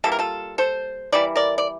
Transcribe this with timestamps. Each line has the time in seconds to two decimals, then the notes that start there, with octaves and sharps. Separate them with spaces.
0.04 E3 G3 A#3 A4
0.12 A#4
0.19 F4 A4
0.58 A4 C5
1.12 E3 G3 A#3 D5
1.36 A#4 D5
1.58 D5